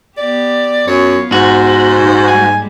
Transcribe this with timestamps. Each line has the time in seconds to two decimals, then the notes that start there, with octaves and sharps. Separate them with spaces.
0.17 B3 G4 D5
0.87 F#2 B3 F4 C#5
1.32 G#2 F#4 C5
1.97 A#2 D#4
2.28 G3 G#3 A#3 G#5